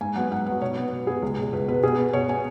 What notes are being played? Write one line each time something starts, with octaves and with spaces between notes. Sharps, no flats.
G#2 G#5
F#3 B3 F#5
G#2 F#5
F#3 B3 F#5
B2 C#5
B3
B2
B3 G#4
C#2
B2 G#3
C#2 B4
B2 G#3 B4
B2 G#4
B3
B2 C#5
B3 G#5